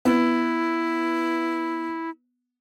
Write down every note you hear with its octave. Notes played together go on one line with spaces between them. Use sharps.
B3 E4